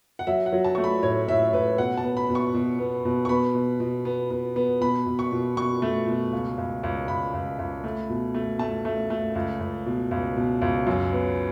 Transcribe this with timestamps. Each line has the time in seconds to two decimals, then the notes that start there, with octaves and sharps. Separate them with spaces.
0.19 F#5
0.27 F#3 E5
0.46 F#5
0.53 F#3
0.64 A5
0.75 A3 C#6
0.84 B5
1.03 A2 C#5
1.28 A2 E5
1.53 A2 B4
1.78 B2 F#5
1.97 A5
2.04 B3
2.17 B5
2.30 B2
2.35 C#6
2.54 B2
2.79 B3
3.05 B2
3.25 C#6
3.29 B3 B5
3.55 B2
3.80 B2
4.05 B3
4.30 B3
4.56 B3
4.81 B2 B5
5.06 B2
5.19 C#6
5.32 B2
5.57 B2 C#6
5.82 A3
6.07 B2
6.33 C#2
6.58 C#2
6.83 C#2
7.08 C#2 B5
7.34 C#2
7.59 C#2
7.84 A3
8.10 B2
8.34 A3
8.59 A3 A5
8.85 A3
9.10 A3
9.35 C#2
9.60 C#2
9.86 B2
10.11 C#2
10.37 B2
10.62 C#2
10.87 F#2
11.12 B3